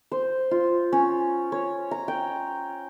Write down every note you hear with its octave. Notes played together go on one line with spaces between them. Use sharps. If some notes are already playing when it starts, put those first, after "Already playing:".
C5
F4
C#4
C#5
A#5
G5